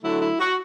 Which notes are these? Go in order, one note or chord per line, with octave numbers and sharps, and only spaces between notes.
D3 F#3 A3 E4
E4
F#4